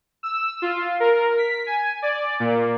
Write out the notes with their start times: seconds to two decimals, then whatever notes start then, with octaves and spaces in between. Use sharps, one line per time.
0.23 E6
0.62 F4
1.00 A#4
1.38 B6
1.66 G#5
2.02 D5
2.40 A#2